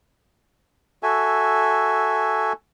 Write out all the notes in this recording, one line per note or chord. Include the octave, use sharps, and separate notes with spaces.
F#4 A4 E5 G#5